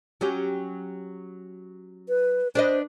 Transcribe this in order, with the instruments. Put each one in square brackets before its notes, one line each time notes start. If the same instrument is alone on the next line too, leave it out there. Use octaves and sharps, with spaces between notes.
[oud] F#3 C#4 G4
[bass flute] B4
[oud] D4 B4 D#5 [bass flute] C5